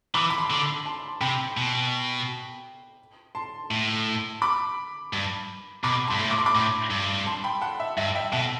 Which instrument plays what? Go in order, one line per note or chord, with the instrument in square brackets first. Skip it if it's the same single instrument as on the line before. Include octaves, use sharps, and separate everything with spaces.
[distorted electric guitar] E3 [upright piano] B5 D6
[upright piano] B5
A5 C6
[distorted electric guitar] D3 [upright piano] D6
[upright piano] A5 C6
A5 C6
[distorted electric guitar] C3 [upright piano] G5 B5
[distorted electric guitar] B2
[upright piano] A5 C6
[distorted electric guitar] A2
[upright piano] B5 D6
[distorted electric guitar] G2
[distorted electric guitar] B2 [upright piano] B5 D6
[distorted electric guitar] G2 [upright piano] A5 C6
[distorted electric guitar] A2
[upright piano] D6
C6
B5 D6
[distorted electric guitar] A2
G2
[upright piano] A5 C6
G5 B5
F#5 A5
E5
[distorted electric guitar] G2 [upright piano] E5
[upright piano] E5 G5
[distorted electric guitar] B2 [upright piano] F#5 A5